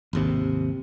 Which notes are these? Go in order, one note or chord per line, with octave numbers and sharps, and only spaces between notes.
G#1 D#2 C3